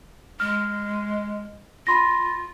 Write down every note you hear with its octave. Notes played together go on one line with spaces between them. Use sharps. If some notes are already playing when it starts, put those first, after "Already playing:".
G#3 F6
F4 B5 C6 A#6